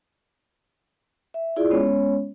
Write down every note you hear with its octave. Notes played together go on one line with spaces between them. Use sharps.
E5
E4 F4 G#4 D5
G#3 B3 C#4 C#5